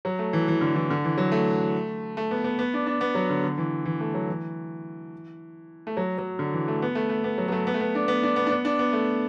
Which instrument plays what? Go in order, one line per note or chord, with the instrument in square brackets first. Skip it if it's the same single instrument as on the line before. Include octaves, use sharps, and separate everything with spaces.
[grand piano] F#3
A3
E3
E3
D3
E3
D3
E3
F#3
A3
A3
B3
B3
B3
D4
D4
B3
F#3
D3
D3
E3
E3
A3
F#3
E3
A3
F#3
F#3
D3
E3
A3
B3
A3
A3
B3
F#3
F#3
A3
B3
A3
B3
D4
B3
D4
B3
D4
B3
D4
B3
A3